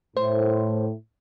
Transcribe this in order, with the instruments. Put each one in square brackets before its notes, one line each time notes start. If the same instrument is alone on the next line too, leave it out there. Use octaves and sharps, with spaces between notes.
[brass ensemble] A2 [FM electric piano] C5